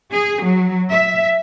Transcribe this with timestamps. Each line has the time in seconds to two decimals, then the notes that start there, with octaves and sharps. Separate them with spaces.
0.12 G#4
0.44 F#3
0.90 E5